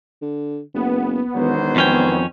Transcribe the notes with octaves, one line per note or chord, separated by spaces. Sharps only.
D3
F#1 B3
E1 D#3 F#3 C5
F2 C#4 G5